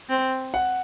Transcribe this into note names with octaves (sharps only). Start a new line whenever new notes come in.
C4
F#5